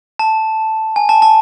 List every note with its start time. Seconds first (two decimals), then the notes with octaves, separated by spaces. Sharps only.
0.19 A5
0.96 G#5
1.09 A5
1.22 A5